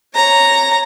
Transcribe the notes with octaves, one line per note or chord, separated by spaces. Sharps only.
C#5 A#5